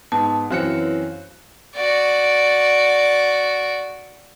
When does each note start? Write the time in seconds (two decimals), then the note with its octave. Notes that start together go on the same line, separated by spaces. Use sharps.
0.12 G#2 B3 A5
0.51 F#2 E3 F#3 C4 F5 F#6 C#7
1.75 F#4 D5